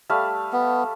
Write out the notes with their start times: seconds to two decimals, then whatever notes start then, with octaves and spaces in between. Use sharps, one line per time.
0.10 G3 A3 F5
0.53 B3